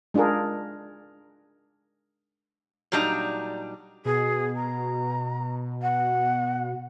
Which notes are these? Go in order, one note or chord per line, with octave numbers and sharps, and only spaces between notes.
G#3 D4 F4 G#4 A#4
A#2 F#3 G3 D4 D#4 A#5
B2 G#4
A#5
F#5